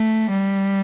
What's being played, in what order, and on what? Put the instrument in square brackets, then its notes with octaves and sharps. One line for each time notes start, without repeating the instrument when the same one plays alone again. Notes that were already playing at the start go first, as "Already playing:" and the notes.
Already playing: [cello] A3
G3